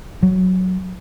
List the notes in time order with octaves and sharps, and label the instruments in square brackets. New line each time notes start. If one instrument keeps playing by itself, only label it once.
[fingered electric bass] F#3